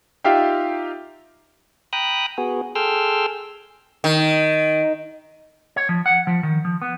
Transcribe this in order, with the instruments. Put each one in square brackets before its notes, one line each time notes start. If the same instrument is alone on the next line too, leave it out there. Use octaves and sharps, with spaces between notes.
[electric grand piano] D#4 F4 G4 E5 F5 G5
[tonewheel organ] G5 A#5 B5 D#6 F#6
B3 F#4 G#4
G#4 A4 G5 C6 E6 F6
[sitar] D#3
[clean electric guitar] C#5
F3
F#5
F3
D#3
F3
B3